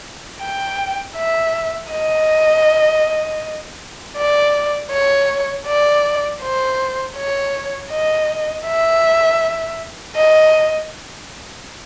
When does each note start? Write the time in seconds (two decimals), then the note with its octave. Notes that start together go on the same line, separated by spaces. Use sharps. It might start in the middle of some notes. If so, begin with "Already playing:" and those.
0.42 G5
1.17 E5
1.92 D#5
4.17 D5
4.92 C#5
5.67 D5
6.42 C5
7.17 C#5
7.92 D#5
8.67 E5
10.16 D#5